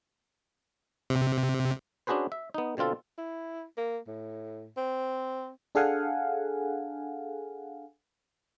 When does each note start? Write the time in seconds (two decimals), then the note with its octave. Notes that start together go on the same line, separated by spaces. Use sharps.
1.10 C3
2.07 C#4 D4 F#4 G#4 B4 C5
2.32 E5
2.54 B3 D#4
2.77 B2 D3 C4 F4 A4
3.18 E4
3.77 A#3
4.08 A2
4.77 C4
5.75 D4 G#4 A4 F5 F#5 G#5